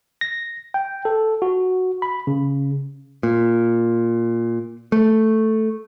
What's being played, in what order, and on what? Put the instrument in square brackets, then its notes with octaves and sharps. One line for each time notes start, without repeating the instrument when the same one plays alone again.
[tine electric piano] A#6
G5
A4
F#4
B5
C#3
[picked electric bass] A#2
A3